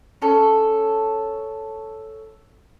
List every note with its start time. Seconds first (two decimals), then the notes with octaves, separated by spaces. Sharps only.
0.22 C#4 A4